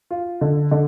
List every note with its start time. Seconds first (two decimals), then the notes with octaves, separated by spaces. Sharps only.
0.11 F4
0.41 D3
0.71 D3